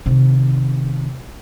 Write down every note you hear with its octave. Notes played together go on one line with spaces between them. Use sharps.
C3 D#3